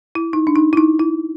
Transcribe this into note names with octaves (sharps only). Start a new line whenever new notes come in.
E4
D#4
D4
D#4
E4
D#4
E4